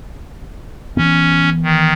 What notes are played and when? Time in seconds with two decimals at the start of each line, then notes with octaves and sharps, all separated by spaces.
0.97 E3 B3 C#4
1.64 D#3